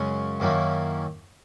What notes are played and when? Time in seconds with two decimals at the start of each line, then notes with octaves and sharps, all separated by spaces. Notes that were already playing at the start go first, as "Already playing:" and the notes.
Already playing: F#2 C#3 G#3 C#4
0.40 F#2 D#3 A#3 C#4 E4